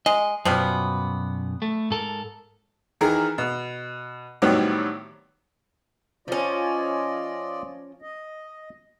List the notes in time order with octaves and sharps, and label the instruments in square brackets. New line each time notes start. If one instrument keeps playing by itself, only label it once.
[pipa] G#3 [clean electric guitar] D#5
[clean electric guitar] F#2 B2 [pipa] F3 G3 B3
[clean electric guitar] A3
G#2 A4 A#4
[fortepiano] D#3 E3 G#4 A#4
B2
A2 D#3 F#3 G3 B3 C4
[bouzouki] F3 C#4 [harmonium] F4 D5 D#5
[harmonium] D#5